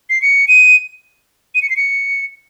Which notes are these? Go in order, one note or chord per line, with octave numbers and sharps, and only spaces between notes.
C7
C#7
D#7
D#7
C#7
C7
C#7